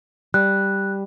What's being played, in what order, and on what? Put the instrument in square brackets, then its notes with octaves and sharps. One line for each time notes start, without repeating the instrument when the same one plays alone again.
[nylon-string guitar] G3 [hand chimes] F#6